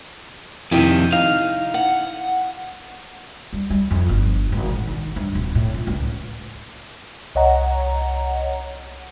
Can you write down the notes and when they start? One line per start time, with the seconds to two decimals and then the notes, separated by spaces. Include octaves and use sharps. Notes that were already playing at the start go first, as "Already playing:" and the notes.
0.71 F2 C3 D#3 E4 G4 D#5
1.12 D#4 F5
1.74 F#5
3.53 G3
3.70 G3
3.91 F2
4.09 G1
4.52 G#1
4.70 A1
4.87 D#3
5.16 G2
5.35 D1
5.55 A2
5.74 F4
5.87 C#2
7.35 C2 C#5 D#5 F#5 A#5